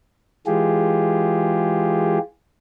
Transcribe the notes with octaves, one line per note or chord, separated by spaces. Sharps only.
E3 G#3 F4 G4 G#4